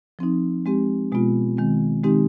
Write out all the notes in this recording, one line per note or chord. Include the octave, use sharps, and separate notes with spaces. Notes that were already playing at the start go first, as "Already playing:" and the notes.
F3 C4 D#4
G#3 C4 G4
B2 G#3 B3 F4
D#3 G#3 C4
D#3 G#3 C4 D#4 G4